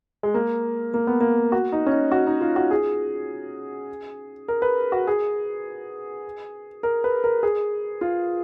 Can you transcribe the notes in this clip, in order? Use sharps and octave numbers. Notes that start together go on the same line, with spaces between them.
G#3
A#3
A#3
B3
A#3
F#4
D#4
C#4
D#4
F#4
D#4
F4
F#4
G#4
A#4
B4
F#4
G#4
A#4
B4
A#4
G#4
F4